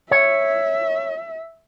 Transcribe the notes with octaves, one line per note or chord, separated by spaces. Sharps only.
C#5 E5